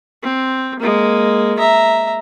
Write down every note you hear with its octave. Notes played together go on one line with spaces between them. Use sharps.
C4
G#3 A#3
E5 A#5